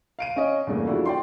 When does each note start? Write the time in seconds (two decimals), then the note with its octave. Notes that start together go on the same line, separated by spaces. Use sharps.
0.19 F5 D7 D#7
0.36 C#4 D#5
0.67 E2 G2 C#3 A3 A#3
0.87 C#3 F3 D4 E4 F#4 A4
1.05 D5 G5 C6